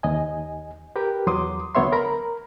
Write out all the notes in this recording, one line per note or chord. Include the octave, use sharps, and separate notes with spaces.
D#2 D#5 G#5
G4 A#4 B4 G5
E2 F#3 C6 D6 D#6
D2 F#3 B3 C#5 E5 C6
A#4 A#5 B5